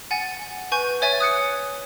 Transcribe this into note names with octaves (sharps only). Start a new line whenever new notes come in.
F#5 G#5 A6
B4 G#5 C#6 G6
C#5 E5 G#5 A6
D#6 F#6 C#7